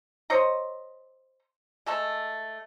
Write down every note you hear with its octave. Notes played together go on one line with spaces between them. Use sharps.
C5 C#5 D#5 A#5
G#3 A3 A5